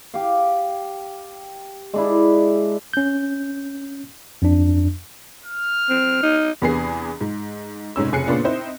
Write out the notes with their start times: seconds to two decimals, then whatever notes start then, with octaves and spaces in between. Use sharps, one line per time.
0.14 G4 F5
1.94 G#3 D4 E4
2.93 C#4 G6
4.42 F2 D4
5.45 F6
5.89 C4
6.23 D#4
6.62 E2 C3 B3 D4 G#4 C7
7.21 G#2
7.96 F1 G#2 C#4 E6
8.12 F1 C#3 G#5 F#6 C7 C#7
8.27 A#2 C#3 B3 D4 F4
8.44 C4 D#4 E4 C5